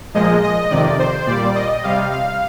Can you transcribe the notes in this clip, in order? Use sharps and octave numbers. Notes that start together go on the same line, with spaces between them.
A#2 F3 G#3 D#5
D#5
F2 C3 D#3 D5
C5
A#2 G3 D5
D#5
C3 G3 F5
F5